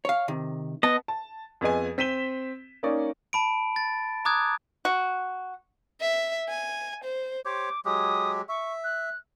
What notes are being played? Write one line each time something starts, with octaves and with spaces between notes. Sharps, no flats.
C#5 F5
C3 D#3
B3 D#5 A5
A5
F2 B3 G#4 D#5 G#5
C4 B6 D#7 E7 G7
A#3 C#4 D#4 D5 C#6
A5 B5 D7
A6
A#5 D6 D#6 F#6 G#6
F#4
E5
G#5
C5
G4 C5 C#5 D6
F#3 G#3 G4 D#6
E5 C#6
F#6